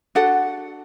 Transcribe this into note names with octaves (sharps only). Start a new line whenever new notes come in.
D4 F#4 A4 F#5